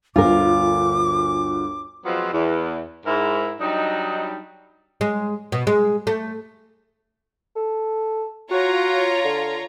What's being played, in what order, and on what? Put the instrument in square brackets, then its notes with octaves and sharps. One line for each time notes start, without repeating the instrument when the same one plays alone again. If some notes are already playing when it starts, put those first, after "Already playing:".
[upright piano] G1 D2 [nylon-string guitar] F4 A#4 [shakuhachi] D6
[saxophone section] F3 F#3 G#3 B3 C4 F4
E2
G#2 E4 A#4
F#3 G3 D4 D#4
[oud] G#3
B2
G#3
A3
[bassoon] A4
[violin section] F4 C#5 A#5 [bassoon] F#4
[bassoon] D3